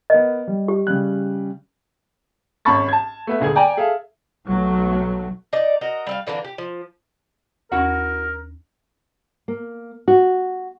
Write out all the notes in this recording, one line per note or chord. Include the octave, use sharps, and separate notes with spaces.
B3 A#4 D#5
G3
G4
C#3 G3 F#6
G#1 C#4 A5 B5 C#6 A6
A5 G#6
A3 B3 E5
D#1 D3 G#4 G#6
D5 G5 G#5 A#5
G#4 A4 E5 F5
B1 F#3 A3
D#4 D5
F#4 A#4 D#5
G3 E5 F5
D3 E3 A#3 D4
G4
F3
D#2 C#4 E4 F#4 A#4 F#5
A#3
F#4